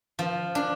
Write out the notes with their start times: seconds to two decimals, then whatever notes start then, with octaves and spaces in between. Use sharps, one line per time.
0.19 F3
0.55 D4